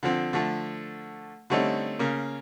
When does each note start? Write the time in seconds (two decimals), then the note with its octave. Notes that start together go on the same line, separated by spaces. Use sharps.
0.03 D3 F3 C4
0.33 D3 F3 A3
1.50 D3 G3 A3 C4 C#4 D#4
1.99 C#3 A#3